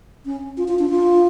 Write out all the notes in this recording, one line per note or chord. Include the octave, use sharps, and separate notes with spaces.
C#4
F4
F4
D4
F4